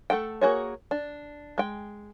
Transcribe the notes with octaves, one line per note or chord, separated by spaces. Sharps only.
A3 A4 F#5 G5
A#3 F#4 G#4 C#5
D4
G#3 G5